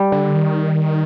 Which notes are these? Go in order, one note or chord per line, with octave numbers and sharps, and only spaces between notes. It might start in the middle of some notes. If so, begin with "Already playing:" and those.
Already playing: G3
D3
D#3